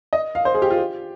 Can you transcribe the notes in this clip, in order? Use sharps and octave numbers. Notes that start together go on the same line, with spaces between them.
D#5
F5
C5
G#4
G4
F4
G4